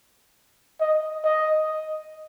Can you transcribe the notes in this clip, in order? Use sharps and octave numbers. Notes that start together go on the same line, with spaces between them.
D#5
D#5